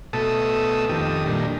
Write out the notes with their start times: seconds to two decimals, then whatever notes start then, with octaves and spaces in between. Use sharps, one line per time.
0.13 B2 A3 A5 D#6 E6
0.89 F2 D#3 G4 D#6
1.26 A#2 D#3 G3 D4